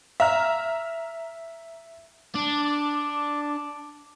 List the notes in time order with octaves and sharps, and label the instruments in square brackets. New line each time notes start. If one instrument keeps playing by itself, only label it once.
[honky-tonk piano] E5 A#5 F6
[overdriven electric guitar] D4 [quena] D6